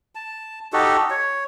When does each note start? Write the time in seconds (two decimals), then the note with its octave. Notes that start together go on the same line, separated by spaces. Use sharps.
0.15 A5
0.73 D#4 F#4 G4 A4
1.10 C#5